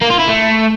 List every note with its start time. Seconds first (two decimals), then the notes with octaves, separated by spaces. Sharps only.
0.01 A#3
0.10 F4
0.19 E4
0.28 A3